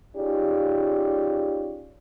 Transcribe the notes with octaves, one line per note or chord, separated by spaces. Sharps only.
C#4 D#4 F4 G4 G#4 D5